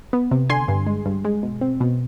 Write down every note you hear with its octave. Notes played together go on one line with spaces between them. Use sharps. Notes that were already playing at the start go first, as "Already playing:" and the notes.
B3
C3
D3 G#5 C6
G2
G#3
G2
G#3
B2
C4
B2